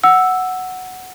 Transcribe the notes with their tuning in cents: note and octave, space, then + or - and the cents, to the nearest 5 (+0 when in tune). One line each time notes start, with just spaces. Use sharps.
F#5 +0 E6 +0